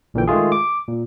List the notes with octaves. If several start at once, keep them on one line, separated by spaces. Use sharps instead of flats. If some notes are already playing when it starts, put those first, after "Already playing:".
A#1 A#2 D3 E3 G5
D#3 G#3 A3 F4 G#4
D6
A#2